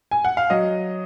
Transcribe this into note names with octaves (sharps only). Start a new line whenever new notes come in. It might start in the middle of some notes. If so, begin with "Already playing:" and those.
G#5
F#5
F5
F#3 D#5